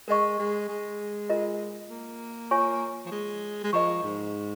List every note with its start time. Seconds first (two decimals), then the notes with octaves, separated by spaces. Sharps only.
0.08 G#3 A#4 D#5 C#6
0.39 G#3
0.69 G#3
1.30 F4 A#4 D#5
1.90 A#3
2.51 F4 C#5 G#5 C#6
3.06 F3
3.11 G#3
3.64 G#3
3.73 F3 A#4 D#5 A#5 C#6
4.03 G#2